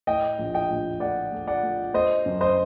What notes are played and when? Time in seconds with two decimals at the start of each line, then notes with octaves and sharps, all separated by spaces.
0.07 A2 D#5 G5
0.39 A#1
0.54 D#5 G5
0.70 A#1
1.00 A3 D5 F#5
1.32 A3
1.47 D5 F#5
1.63 A3
1.94 A3 C5 D#5
2.26 F#2
2.41 C5 D#5